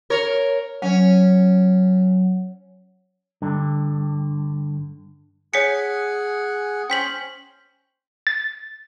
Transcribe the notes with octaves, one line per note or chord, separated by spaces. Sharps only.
A#4 C#5
F#3 C#4
G2 D3
G#4 C#5 F#5 G#5 B6 C#7
C#4 C5 G5 B6 F#7
A6